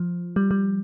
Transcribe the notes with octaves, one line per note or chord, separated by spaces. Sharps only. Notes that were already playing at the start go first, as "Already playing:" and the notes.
Already playing: F3
G3
G3